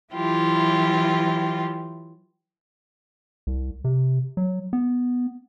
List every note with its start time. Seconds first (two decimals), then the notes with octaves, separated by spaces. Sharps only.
0.14 E3 F#3 E4 F4 G4
3.47 C2
3.84 C3
4.37 F#3
4.73 B3